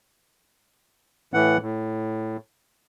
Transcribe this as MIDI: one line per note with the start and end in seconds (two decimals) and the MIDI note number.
1.34 1.57 45
1.34 1.57 52
1.34 1.57 78
1.62 2.37 45